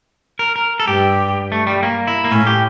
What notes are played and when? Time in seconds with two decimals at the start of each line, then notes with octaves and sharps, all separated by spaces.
0.39 A#4
0.56 A#4
0.80 A4
0.87 G2 G4
1.52 A3
1.67 G3
1.83 A#3
2.07 E4
2.24 A#3
2.31 A2 C#4
2.47 G4